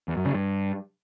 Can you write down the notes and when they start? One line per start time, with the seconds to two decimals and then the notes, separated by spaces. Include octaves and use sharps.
0.08 E2
0.17 F#2
0.26 C#3
0.34 G2